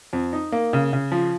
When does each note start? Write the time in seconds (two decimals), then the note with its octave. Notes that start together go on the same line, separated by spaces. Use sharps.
0.13 F2
0.33 D#4
0.52 A#3
0.73 C#3
0.93 C#3
1.12 F3